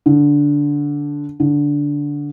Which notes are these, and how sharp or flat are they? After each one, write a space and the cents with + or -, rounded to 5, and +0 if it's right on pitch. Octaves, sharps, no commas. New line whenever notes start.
D3 -10
D3 -10